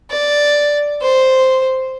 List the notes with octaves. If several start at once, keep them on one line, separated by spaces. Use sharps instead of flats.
D5
C5